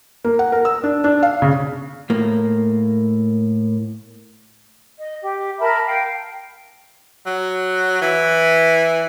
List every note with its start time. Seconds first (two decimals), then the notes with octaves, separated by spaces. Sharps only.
0.25 A#3
0.39 F#5
0.52 A#4
0.65 E6
0.84 D4
1.04 D4
1.23 F5
1.42 C#3
2.10 A2 A#3
4.99 D#5
5.22 G4
5.59 A#4 E5 A5 B5
5.86 F5 G5
7.26 F#3
8.02 E3